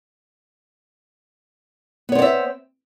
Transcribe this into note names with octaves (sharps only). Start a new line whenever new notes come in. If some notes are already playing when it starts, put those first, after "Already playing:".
B3 C4 C#5 D5 E5